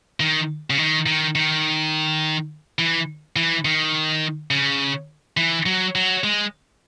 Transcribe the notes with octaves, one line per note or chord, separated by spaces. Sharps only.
D#3
C#3
D#3
D#3
D#3
E3
E3
D#3
C#3
E3
F#3
F#3
G#3